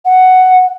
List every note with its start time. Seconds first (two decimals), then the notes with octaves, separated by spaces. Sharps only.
0.06 F#5